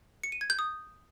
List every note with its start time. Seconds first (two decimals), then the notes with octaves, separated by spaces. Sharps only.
0.24 C#7
0.32 D#7
0.41 G#6
0.50 G6
0.59 D#6